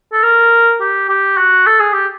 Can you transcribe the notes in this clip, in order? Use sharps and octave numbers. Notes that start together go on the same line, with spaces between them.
A4
A#4
G4
G4
F#4
A4
G#4
G4